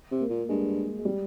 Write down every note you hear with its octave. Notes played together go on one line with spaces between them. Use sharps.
C3
A#3
A#2
G2 G#3
G#3
G3